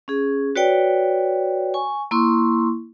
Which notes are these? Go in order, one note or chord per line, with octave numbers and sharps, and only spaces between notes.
C#4 G#4
F#4 B4 C#5 D5 G5
G#5 C#6
A#3 E4 C6 C#6